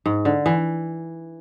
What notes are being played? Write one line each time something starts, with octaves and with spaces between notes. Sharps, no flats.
G#2
D3
E3